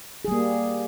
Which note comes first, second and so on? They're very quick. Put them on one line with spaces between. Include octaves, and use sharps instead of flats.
G#4 G3 A#3